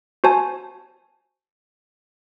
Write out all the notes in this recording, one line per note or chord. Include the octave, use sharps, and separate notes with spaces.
F#4 C5 G#5 A5